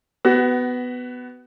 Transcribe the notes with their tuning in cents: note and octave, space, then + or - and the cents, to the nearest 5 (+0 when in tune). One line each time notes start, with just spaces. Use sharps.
B3 +10 F#4 +30